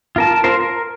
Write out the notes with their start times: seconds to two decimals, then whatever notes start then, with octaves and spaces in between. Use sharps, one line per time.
0.16 F4 A#4 A5
0.44 F4 A#4 C5
0.60 A#4